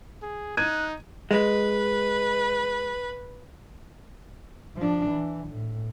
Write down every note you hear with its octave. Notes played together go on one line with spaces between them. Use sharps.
G#4
D#4 F#6 G#6 D#7
G#3 B4
F3 D4
E3
A2